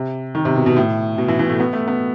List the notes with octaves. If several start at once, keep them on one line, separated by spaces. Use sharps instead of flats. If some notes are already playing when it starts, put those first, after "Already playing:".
Already playing: C3
D#3
C3
B2
B2
A2
B2
E3
E3
A3
B3
A3
B3